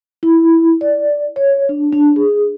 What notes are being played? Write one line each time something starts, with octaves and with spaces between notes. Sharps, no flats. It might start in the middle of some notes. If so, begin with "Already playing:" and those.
E4
D5
C#5
D4
D4
G#4